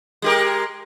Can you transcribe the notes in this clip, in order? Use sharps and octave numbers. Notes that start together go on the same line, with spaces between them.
G#3 G4 A#4